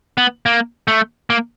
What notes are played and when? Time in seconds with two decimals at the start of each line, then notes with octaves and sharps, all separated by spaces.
0.18 B3
0.46 A#3
0.88 A3
1.30 A#3